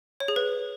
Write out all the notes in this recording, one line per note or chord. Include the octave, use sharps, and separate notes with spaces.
C#5
G#4
B4